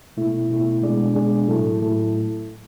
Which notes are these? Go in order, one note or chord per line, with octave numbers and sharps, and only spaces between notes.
B2 A3 E4
B2 A3 E4
B2 G#3 D4 G#4 D5
B2 G#3 D4 G#4 D5
A2 F#3 A3 E4 A4
A2 F#3 A3 E4 A4